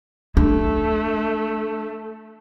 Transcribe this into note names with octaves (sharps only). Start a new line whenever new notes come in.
A3 D4